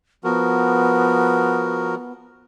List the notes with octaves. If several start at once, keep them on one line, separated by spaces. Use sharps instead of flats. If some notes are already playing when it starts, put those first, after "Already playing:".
F3 B3 F#4 A#4